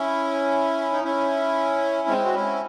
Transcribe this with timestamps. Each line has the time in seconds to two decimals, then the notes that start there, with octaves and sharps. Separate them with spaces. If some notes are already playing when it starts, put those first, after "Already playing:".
Already playing: C#4 E4
0.92 D#4
1.04 C#4 E4
2.08 G#3 C4
2.26 F#4
2.34 C#4 E4